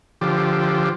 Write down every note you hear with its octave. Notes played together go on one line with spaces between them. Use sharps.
D3 F3 G4